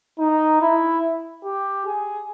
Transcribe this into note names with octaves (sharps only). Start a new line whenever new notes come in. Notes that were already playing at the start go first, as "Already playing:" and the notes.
D#4
E4
G4
G#4